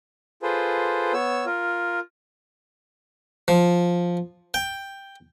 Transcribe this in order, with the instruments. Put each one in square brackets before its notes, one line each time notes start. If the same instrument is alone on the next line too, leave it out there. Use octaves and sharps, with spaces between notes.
[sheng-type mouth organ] F4 G#4 A4 B4 C5
B3 C#5 E6
F4 A#4
[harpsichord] F3
G5